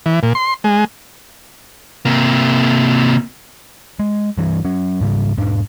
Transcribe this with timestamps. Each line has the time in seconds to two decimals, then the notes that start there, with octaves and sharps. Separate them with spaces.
0.06 E3
0.23 A#2
0.35 C6
0.64 G#3
2.05 C3 A#3
3.99 G#3
4.38 G2 E3
4.65 F#3 C#4
5.01 G#2 C#3 G3
5.37 E1 G#2 D4